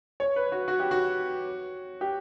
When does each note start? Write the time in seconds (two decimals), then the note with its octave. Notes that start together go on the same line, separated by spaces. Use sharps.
0.20 C#5
0.36 B4
0.52 F#4
0.68 F#4
0.80 G4
0.91 F#4
2.01 G4